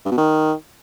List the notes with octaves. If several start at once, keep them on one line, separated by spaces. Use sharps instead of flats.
G2
B2
D#3